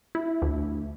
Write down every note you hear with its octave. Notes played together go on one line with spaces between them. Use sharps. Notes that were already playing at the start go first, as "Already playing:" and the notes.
E4
D2